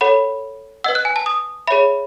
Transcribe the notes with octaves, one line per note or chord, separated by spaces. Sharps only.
A4 C#5 F#5 B5
B4 D#5 F#5 E6
F#6
G#5
A5
D#6
G#4 C#5 E5 B5